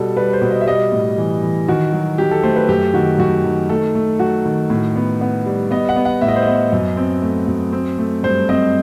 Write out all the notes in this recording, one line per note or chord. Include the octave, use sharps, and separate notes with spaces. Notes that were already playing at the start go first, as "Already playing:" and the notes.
Already playing: B2 G3 A4
G3 B4
C5
B2
D#5
E5
G3 D#5
A2
E3
E3
D#3 F#4
F#3
F#3 G4
A4
A3 C5
B4
F#2 G4
D#3 F#4
F#2 F#4
D#3
A3 A4
A3
F#3 F#4
D#3
A2
B3
B3
G3
B3 D#5
F#5
B3
F#5
A2 E5
D#5
C5
B3 D#5
F#2
C4
A3
F#2
C4
A3
G2 C5
C4 D#5